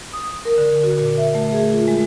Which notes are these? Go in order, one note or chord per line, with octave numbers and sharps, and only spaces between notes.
D#6
A#4
D3
F#4
A#2
E5
A3
G#4
F4
G#3